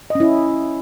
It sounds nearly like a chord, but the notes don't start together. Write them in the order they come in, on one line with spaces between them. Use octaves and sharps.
D#5 C#4 E4